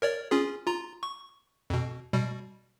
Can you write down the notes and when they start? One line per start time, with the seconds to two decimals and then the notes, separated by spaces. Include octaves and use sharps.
0.02 A#4 C#5 D5
0.31 C#4 F4 G#4
0.67 F4 A#5
1.03 C#6
1.70 F2 B2
2.13 B2 G3